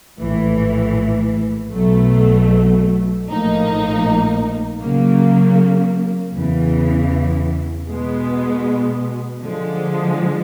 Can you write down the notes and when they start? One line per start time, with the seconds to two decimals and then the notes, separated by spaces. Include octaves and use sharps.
0.18 A#1 A2 E3
1.72 B1 B2 F#3 A3
3.26 A#1 A2 F3 A#3 D#4
4.80 C#3 F#3 A#3
6.35 E2 C#3 E3
7.88 B2 G#3 B3
9.42 D3 F3 G#3